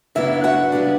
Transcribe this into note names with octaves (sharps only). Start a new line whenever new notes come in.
F#2 C#3 F#3 B3 D4 E4 E5
F#4 F#5
C#3 G3 B3 D4